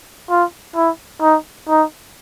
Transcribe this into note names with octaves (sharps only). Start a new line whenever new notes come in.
F4
E4
D#4
D#4